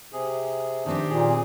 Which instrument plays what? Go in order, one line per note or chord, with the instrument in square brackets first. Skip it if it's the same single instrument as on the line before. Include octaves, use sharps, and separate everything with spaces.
[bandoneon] C3 G#4
[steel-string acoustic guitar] D#3 C4 G4 [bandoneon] D4
[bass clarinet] A#2 [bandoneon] G#4